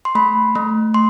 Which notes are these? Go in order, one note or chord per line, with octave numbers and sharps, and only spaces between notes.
C6
A3 B5
A3
C6